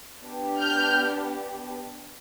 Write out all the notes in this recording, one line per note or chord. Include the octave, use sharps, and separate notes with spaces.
B3 D4 G4
F6 G6